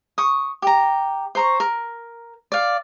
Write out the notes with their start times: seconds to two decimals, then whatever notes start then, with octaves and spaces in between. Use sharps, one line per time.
0.18 C#6 D#6
0.62 G4 A#5
1.35 C5 A#5 C#6
1.60 A#4
2.52 D5 F5